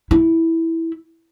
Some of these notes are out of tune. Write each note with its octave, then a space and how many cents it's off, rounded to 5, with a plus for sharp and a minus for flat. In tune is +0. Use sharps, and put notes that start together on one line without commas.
E4 -10